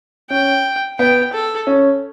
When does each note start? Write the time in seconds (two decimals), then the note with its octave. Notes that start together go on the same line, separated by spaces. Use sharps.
0.30 C#4 G5
0.99 B3 G5
1.33 A4
1.67 C#4